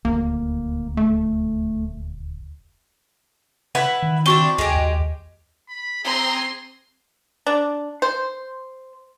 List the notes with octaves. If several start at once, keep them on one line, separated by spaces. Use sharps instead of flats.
D#1 D2 A#3
A3
E4 B4 F#5
D#3
C4 D4 E4 F#4 C#6 G7
D#2 G#3 G4
D#2
B5
C4 G#4 A#5 C6
D4
C5